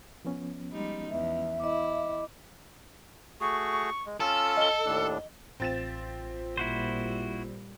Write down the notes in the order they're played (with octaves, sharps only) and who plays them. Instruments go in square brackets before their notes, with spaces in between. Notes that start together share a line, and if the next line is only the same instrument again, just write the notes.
[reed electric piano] F3 B3 C#4
[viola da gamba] G3 G#3 D#4
[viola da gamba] E2 [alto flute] E5
[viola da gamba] E4 [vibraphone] D#5 D6
[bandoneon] A3 F#4 G#4 [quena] C#6
[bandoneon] G#3
[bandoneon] C#4 F4 [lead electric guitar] A4 [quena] E6
[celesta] D#5 G7
[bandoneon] D#2 A2 D4
[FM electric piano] A1 F4 B6 [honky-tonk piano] C4 A6 E7
[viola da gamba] A#2 G3 [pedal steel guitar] E4 F#4 C5